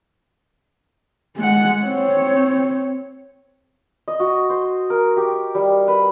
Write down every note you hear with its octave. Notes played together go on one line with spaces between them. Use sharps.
G#3 F#5
C4 C#5
D#5
F#4
C5
A#4
G4
G3
B4